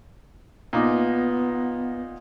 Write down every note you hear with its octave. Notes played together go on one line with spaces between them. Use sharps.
A#2 B3 D#4 D6